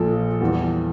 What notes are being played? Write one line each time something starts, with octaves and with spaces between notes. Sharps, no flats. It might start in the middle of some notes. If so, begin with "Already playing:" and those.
Already playing: A#1 A#2 F3 A4
E2 E3 G3